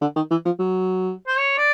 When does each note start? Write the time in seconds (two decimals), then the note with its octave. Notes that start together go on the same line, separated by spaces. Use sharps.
0.01 D3
0.16 D#3
0.31 E3
0.45 F3
0.59 F#3
1.28 C5
1.38 C#5
1.58 D5